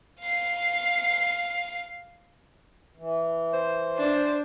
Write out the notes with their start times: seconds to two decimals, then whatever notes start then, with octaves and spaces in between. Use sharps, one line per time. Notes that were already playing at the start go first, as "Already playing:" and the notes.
0.20 F5 C7
2.98 E3
3.54 C5
3.97 D4